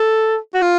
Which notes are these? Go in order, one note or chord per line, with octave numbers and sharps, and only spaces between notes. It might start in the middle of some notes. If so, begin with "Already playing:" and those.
Already playing: A4
F#4
F4